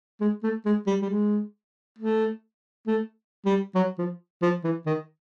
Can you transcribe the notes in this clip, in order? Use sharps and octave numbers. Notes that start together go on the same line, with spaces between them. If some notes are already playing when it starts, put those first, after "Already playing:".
G#3
A3
G#3
G3
G3
G#3
A3
A3
G3
F#3
F3
F3
E3
D#3